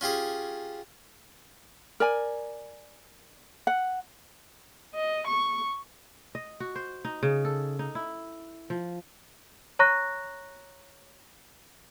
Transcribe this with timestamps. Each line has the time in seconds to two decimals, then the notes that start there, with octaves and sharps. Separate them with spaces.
0.01 C#4 F4 G4 G#4
2.00 A#4 D5 G#5
3.67 F#5
4.95 D#5
5.27 C#6
6.35 D#5
6.60 F#4
6.75 C5
7.05 D#4
7.23 C#3
7.45 A4
7.79 D#4
7.95 E4
8.70 F3
9.79 C#5 A#5 C#6 F#6 A#6